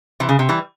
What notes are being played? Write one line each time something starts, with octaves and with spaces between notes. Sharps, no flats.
C3 E3
C#3
C3
E3 G3